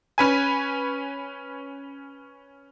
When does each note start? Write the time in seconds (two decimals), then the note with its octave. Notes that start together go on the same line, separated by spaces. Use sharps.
0.18 C#4 B4 G#5